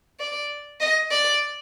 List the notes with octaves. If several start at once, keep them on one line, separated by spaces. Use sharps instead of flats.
D5
D#5
D5